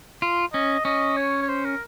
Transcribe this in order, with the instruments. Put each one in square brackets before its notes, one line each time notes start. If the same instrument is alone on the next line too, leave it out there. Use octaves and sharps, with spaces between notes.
[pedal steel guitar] F4
[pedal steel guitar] C#4 [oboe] D#5
[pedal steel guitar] C#4 [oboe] D#5
[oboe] C#5
C#5
C5
A#4